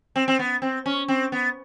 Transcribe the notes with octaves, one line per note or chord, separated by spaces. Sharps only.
C4
C4
B3
C4
C#4
C4
B3